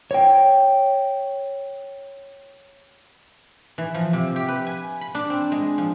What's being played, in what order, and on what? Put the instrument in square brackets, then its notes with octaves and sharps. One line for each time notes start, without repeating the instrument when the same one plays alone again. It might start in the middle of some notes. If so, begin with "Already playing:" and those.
[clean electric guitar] C#5 G5
[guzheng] E3
F3
C3
G4
B4
G#5
B5
D4
C4
G#3
F3